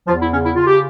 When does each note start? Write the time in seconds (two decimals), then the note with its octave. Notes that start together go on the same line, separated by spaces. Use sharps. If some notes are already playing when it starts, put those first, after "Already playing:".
0.07 E2 F3 F4
0.20 E4
0.31 C#3 C#4
0.44 E4
0.55 C#3 F4
0.67 G4